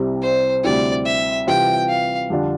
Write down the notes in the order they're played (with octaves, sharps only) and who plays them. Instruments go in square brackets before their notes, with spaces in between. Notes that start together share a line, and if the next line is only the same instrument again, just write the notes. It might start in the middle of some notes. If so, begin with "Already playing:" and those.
Already playing: [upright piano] C2 C3 G3 C4 E4
[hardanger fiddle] C5
[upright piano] D2 C3 G3 C4 E4 [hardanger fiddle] D5
[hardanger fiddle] E5
[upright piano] C3 E3 G3 C4 F4 [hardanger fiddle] G5
[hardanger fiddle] F5
[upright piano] F2 D3 G3 D4 F4